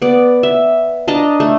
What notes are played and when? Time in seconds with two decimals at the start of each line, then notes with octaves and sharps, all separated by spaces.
0.02 B3 D5
0.43 E5
1.08 D4 D#5 A5 A#5
1.40 A3